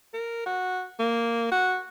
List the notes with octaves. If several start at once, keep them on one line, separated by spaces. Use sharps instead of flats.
A#4
F#4
A#3
F#4